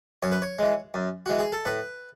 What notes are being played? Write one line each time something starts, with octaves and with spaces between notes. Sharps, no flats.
F#2 C#5
B4
C#5
E3 G#3
F#2
E3 G#3 F#4
G#4
A4
A2 B4